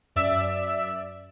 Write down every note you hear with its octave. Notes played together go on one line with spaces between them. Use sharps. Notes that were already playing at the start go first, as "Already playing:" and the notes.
F#2 D5 E5 E6